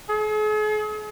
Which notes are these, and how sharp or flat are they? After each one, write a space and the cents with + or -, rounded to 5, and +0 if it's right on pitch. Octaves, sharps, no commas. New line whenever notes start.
G#4 +45